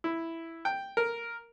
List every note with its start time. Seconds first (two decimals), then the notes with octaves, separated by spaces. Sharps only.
0.04 E4
0.65 G5
0.97 A#4